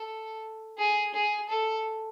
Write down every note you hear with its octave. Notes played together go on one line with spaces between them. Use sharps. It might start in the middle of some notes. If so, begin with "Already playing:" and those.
Already playing: A4
G#4
G#4
A4